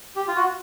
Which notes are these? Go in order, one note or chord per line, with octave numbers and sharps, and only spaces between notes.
G4
F4
F#4